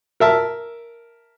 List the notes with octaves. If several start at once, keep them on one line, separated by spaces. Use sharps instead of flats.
A#4 E5 A5